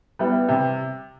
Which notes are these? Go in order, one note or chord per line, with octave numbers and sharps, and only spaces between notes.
G3 B3 E4
C3